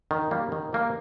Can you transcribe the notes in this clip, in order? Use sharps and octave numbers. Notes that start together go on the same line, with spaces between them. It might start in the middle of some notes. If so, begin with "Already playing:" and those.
D#3
G3 A#3
D#3
G3 A#3